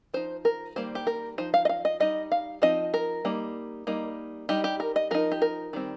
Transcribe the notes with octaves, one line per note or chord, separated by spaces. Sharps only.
F3 D#4 C5
A#4
D#3 G3 A#3 C5
G4
A#4
F3 D#4 C5
F5
D#5
F5
D#5
G3 D#4 D#5
F5
F3 C4 D#4 D#5
A#4
G3 A#3 D#4
G3 A#3 D#4
G3 D#4 G4
G4
A#4
D#5
F3 D#4 A#4
G4
A#4
D#3 G3 C4